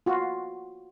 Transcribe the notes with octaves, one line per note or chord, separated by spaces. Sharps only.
F4 F#4